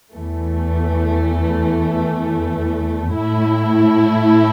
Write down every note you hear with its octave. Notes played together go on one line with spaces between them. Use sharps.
E2 E3 A3
A2 A3 E4